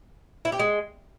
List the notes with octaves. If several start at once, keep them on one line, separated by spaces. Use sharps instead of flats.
E4
G4
G#3